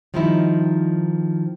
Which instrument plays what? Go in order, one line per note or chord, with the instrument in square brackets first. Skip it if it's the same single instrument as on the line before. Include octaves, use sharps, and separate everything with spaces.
[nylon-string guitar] D#3 F3 G3 C4 D#4 E4